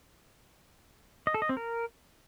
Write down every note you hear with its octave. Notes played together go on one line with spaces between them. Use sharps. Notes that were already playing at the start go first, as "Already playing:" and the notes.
D#5
A4
D#5
C4
A#4